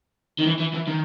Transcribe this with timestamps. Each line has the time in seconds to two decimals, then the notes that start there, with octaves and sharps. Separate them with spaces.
0.39 D#3
0.46 E3
0.60 E3
0.74 E3
0.88 D#3